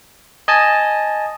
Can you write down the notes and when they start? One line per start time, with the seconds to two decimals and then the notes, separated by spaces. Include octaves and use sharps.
0.48 D#5 G#5 A5